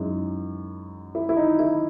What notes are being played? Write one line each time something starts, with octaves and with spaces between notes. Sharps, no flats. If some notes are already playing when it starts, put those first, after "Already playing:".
Already playing: F#2 G#3 D#4 E4
E4
E4
D#4
E4